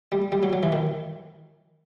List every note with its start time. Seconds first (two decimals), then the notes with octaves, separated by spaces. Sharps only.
0.12 G3
0.32 G3
0.43 F#3
0.53 F#3
0.63 E3
0.72 D#3